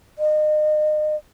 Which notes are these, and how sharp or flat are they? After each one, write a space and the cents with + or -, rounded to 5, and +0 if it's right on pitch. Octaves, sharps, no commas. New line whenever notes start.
D#5 -35